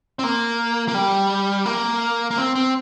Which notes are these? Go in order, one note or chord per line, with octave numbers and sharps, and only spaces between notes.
C4
A#3
A#3
G3
A#3
A#3
C4
C4